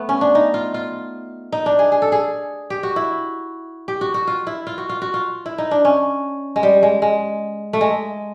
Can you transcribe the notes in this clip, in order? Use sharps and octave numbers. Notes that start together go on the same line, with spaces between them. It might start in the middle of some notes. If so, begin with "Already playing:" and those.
Already playing: A3 B3
C#4
D4
D#4
F4
F4
D#4
D4
G#4
G#4
A4
G#4
G4
F#4
E4
G4
F#4
F#4
F4
E4
F4
F#4
F4
F#4
F4
E4
D#4
D4
C#4
G#3
G3
G#3
G#3
A3
G#3